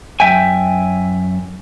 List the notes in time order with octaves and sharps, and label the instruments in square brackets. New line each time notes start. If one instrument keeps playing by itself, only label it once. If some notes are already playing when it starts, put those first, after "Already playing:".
[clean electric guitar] F#2 E5 G5 G#5